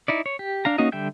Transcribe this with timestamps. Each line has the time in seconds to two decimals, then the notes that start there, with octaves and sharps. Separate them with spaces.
0.08 D#4 E4 D5
0.26 C#5
0.39 G4
0.65 D4 F5 A#5
0.78 A#3 C#4 D#4 F#4 D#5
0.92 D3 G3 E5 G5 G6